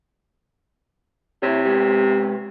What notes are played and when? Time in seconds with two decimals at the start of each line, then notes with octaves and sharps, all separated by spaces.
1.43 C3 E4 C#5
1.65 G#3 B3 G4